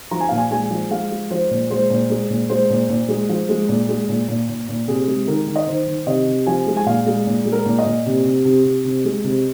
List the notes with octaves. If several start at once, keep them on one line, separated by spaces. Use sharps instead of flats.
F3 A#5
G#5
A#2 F5
G#5
G#3 G#5
F3
G#3 F5
G#3
F3 C5
A#2
G#3 C5
A#2
G#3
A#2
G#3 C5
A#2
A#2
G#3
F3
G#3
A#2
G#3
A#2
A#2
A#2
A#2
C3 G#4
G#3
D#3 A#4
D#3
D#5
D#3 C5
D#3
C3 D#5
C3
F3 G#5
G#3
G#5
A#2 F5
G#3
A#2
G#3
A#4
A#2
D#5
A#2
C3
C3
C3
C3
C3
G#3
C3